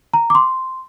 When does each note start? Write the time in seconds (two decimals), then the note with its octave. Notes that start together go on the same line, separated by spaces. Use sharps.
0.14 A#5
0.30 D6
0.35 C6